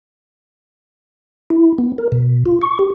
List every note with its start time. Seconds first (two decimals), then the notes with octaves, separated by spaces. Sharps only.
1.50 E4
1.78 B3
1.98 A#4
2.12 B2
2.46 F4
2.62 C#6
2.79 G4